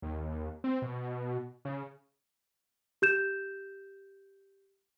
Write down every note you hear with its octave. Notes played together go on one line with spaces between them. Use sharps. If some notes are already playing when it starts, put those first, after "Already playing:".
D#2
C4
B2
C#3
G4 G6 E7